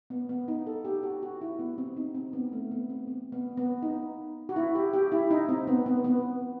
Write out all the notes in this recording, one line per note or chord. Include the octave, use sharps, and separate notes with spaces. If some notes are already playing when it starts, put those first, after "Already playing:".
B3
B3
D#4
A4
G4
F#4
F#4
E4
B3
C4
D#4
C4
B3
A3
B3
C4
B3
B3
B3
D#4
F#4
E4
G4
G4
E4
D#4
C4
B3
B3
B3